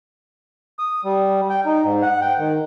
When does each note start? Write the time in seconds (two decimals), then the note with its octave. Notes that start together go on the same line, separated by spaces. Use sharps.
0.79 D#6
1.05 G3
1.50 G5
1.66 D#4
1.84 G#2
2.02 F#5
2.22 G5
2.38 D#3